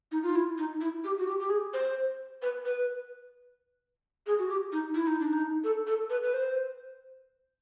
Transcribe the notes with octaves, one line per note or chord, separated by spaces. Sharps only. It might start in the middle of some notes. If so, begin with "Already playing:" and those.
D#4
F4
E4
D#4
E4
G4
F#4
G4
G4
G#4
C5
B4
B4
G#4
F#4
G4
D#4
E4
D#4
D4
D#4
A4
A4
B4
B4
C5